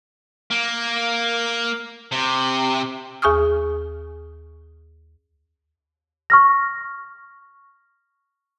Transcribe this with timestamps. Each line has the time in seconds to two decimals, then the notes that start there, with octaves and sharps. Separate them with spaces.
0.51 A#3
2.12 C3
3.22 D#2 G#4 G#5 C#6 D#6 F6
6.30 C#6 F6 A#6